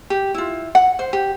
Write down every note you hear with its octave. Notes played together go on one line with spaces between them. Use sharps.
G4
E4 F4
F#5
C5
G4